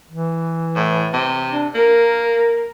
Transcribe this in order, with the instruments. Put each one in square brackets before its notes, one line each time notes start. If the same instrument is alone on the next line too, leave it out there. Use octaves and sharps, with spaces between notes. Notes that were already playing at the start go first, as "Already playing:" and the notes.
[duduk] E3
[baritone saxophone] A2
C3
[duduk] D4
[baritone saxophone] A#3 [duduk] A#4